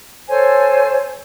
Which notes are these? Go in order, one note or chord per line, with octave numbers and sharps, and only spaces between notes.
A4 C5 C#5 G#5